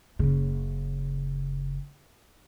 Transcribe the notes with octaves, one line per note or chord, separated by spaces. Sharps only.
F#1 C#3